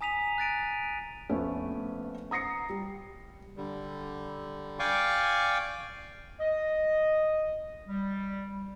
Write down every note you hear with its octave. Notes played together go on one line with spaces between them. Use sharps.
G#5 A#5 D#6 B6 D#7 F7
F#6 A6 D7 D#7
A#1 A3 B3 C#4
A#5 D#6 A#6 C7 C#7
G3
D3 G3
D5 F5 G5 G#5 C#6 D6
D#5
G3